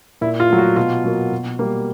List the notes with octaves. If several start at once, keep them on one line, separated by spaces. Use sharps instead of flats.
A#2 E4
F4
F#3 A3
F#4
B2 F4
F#3 A#3
B2
G3 A#3